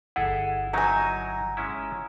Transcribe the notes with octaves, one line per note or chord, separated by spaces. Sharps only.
G1 E4 G#4 A4 F#5
F#3 D#4 E4 G#5 A#5
G#3 C#4 E4